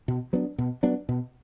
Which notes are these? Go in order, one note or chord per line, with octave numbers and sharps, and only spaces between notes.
B2
F#3 B3 D4
B2
F#3 B3 D4
B2